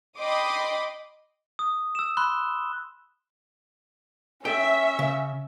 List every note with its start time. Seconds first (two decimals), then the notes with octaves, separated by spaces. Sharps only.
0.18 D#5 G5 B5 C6 D6 D#6
1.59 D#6
1.95 E6 E7
2.17 B5 C6 F#6 G7
4.45 C#4 E5 G5
4.99 C#3